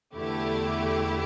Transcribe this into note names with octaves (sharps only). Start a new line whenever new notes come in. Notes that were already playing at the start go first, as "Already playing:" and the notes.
E2 D3 A3 E4 G4